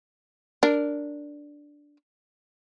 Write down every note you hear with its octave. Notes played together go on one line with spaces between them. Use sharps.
D4 A#4